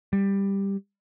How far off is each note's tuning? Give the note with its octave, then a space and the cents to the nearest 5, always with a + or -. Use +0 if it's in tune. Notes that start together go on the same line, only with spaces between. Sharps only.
G3 +10